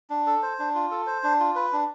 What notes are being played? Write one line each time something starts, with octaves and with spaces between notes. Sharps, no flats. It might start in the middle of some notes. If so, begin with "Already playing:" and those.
D4
A4
C5
D4
F4
A4
C5
D4
F4
B4
D4